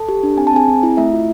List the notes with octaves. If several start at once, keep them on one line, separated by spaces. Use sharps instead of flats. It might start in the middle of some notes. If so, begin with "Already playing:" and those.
Already playing: A4 A5
G4
D4
C4 G#5
A5
C4 G#4 G#5
C4
E4
A3 E4 E5
F4